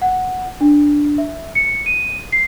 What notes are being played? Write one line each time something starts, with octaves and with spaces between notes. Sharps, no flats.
F#5
D4
E5
C#7
D#7
C7